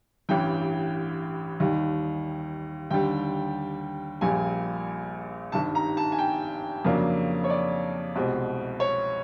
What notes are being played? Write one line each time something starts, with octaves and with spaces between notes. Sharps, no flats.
A1 G2 E3 G5
D#2 D#3 G3
D#2 D3 G3 G5
A#1 A#2 G3 G#5
G#1 G2 D#3 A5
A#5
A5
G#5
G5
F2 C#3 F#3 A#3 D4
C#5
D5
C2 B2 G#3 C4
C#5